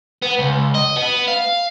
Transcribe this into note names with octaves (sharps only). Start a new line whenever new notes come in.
B3
C#2
D#5
B3
F5